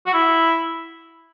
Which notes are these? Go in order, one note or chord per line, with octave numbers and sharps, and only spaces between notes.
F#4
E4